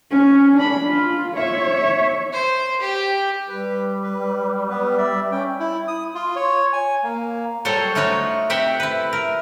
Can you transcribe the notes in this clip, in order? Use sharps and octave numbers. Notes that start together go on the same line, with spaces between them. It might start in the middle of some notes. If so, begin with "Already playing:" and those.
C#4
D4 B5
F4
C#5 E5
C5
G4
G3 B4
B4
B3 B4
D5 E5
C#4 G5
E4
D#6
F4
C#5
G#5
A#3
F#3 G3 A4 C5 C#5
A3 D#4 F4 F#4 C#5
C4 G4 E5 F#5 G5
E4 B4
A#4